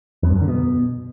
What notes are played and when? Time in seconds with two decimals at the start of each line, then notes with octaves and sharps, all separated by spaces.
0.23 F2
0.29 G2
0.35 F#2
0.42 D3
0.48 B2